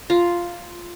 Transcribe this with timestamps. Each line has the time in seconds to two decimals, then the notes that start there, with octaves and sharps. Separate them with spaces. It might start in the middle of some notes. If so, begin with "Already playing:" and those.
0.10 F4 A#5